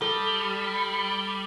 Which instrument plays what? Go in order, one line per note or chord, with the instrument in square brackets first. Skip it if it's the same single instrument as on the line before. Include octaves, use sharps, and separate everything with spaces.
[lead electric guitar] G3 [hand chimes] A4